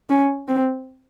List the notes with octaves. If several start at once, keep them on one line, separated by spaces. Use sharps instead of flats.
C#4
C4